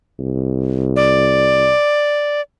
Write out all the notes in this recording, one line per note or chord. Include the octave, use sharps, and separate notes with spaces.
C2
D5